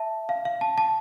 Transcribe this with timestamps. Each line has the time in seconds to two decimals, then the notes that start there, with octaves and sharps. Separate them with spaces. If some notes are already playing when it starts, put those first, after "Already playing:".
Already playing: E5 A5
0.29 F5
0.45 F5
0.61 A5
0.78 A5